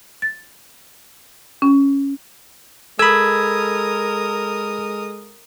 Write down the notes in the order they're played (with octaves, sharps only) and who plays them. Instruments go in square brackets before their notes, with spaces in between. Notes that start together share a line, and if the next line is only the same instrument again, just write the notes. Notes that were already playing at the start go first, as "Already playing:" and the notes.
[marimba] A6
C#4
[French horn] G#3 [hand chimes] A4 G#6 [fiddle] A#4 D#6 [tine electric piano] B5 E6